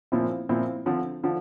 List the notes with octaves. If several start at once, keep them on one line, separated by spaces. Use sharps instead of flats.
A#2 F3 C4 E4
A#2 F3 C4 E4
D3 F3 C4
D3 F3